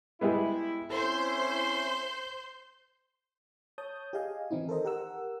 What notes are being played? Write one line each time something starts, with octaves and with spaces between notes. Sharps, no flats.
G3 G#3 B3 E4
C4 C#4 E4 A4 C5 C6 G6
C#5 A5 D#6 G6
G4 G#4 D#5 F5 G#5
D#3 E3 C4 D#4 E4
A4 A#4 C5 D#5
G4 A#4 F#5 E6